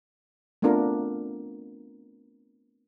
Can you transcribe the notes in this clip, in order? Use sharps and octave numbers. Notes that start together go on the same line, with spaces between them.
A3 B3 C4 D4 F4 A#4